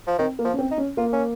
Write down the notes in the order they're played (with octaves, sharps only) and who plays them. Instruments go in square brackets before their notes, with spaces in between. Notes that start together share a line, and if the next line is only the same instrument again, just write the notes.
[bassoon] F3
[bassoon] D#3 [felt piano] C4
[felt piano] A#3
[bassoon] F3
[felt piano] C#4
C4
[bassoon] D#4
[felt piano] C#4
[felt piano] A#3 [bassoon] F4
[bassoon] C#4